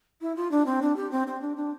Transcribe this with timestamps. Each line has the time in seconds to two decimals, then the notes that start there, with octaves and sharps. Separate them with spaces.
0.21 E4
0.36 F4
0.51 D4
0.66 C4
0.82 D4
0.96 G4
1.11 C4
1.27 C4
1.41 D4
1.57 D4